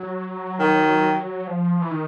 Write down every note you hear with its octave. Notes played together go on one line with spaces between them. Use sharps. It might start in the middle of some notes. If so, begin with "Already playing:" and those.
Already playing: F#3
D#3
F3
E3
D#3